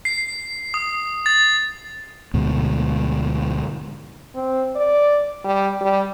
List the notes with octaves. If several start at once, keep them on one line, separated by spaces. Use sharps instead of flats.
C7
D#6
A6
D2 G#2 B2
C4
D5
G3
G3